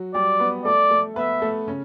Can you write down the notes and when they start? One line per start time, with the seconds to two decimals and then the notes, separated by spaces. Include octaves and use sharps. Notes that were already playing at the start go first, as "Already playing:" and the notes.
Already playing: F#3 F#4
0.14 G3 G4 D5
0.40 B3 B4
0.65 A3 A4 D5
0.91 A3 A4
1.16 B3 B4 E5
1.42 A3 A4
1.67 C#3 C#4